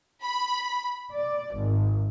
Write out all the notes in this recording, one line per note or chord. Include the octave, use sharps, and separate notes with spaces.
B5
D5
G#1